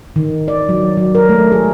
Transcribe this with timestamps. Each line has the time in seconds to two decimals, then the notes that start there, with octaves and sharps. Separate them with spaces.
0.16 D#3
0.48 D5
0.69 F#3
0.97 F#3
1.15 A#4
1.29 A3
1.52 G#4